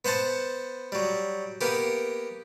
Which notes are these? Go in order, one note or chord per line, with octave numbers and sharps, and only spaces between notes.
B3 C5 F#5 A5
F#3 G3
A#3 B3 G4